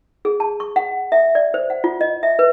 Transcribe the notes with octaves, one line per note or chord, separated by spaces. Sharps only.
G#4
A5
C#6
F#5
E5
D5
C5
F#5
F4
D#5
E5
B4